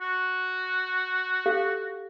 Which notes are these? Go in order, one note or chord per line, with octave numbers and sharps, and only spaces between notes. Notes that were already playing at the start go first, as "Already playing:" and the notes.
F#4
G4 A4 F5